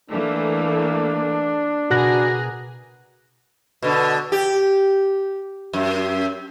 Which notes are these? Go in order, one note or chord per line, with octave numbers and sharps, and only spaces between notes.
E3 A3 A#3 D4
B2 F#4 G#4 A#4 F#6 A#6
B2 D3
G4
F#2